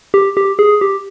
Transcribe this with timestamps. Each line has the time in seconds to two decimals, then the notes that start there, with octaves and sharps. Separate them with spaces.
0.14 G4
0.37 G4
0.59 G#4
0.81 G4